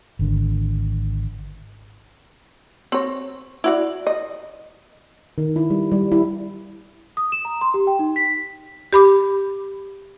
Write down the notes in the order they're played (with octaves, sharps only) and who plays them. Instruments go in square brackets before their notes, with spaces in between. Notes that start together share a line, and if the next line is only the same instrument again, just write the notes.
[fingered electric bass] G#1 D3
[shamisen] C4 C#5
E4 F#4 D5
D#5
[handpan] D#3
E4
G3
G3
E4
[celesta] D#6
E7
A#5
C6
G4
G5
D#4
B6
[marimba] G4 B5 D6